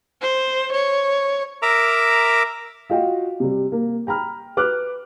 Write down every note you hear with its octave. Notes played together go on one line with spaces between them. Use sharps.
C5
C#5
A#4 E5 A#5 D6 E6
F4 F#4 D#5 F5 G5
C3 G3
A#3
G5 A#5 B5 F6
B4 D6 F6 F#6